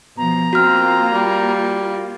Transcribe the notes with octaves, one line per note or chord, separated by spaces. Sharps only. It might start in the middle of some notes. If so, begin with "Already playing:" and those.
B2 F3 A#5
A#3 C4 F4 F#4 F6
G3